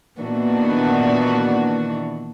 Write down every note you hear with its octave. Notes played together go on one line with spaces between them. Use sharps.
A#2 D#3 E3 B3 D4 F#4